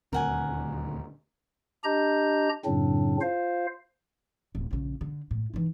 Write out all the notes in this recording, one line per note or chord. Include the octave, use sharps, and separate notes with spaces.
D#1 D2 C4 A#4 F#5 G#5
D4 G4 D#5 A#5 G6
F#2 A2 C#3 F#3 C4 D4
F4 C5 F5
D1
A#1 C#3
D3
A2
E3 D#4